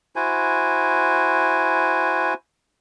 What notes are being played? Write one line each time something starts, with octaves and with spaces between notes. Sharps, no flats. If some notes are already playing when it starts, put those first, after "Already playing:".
E4 F#4 C5 G#5